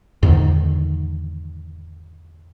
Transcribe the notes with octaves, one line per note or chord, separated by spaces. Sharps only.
E2 G#2 D3 D#3